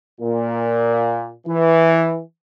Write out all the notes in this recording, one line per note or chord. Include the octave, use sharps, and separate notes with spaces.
A#2
E3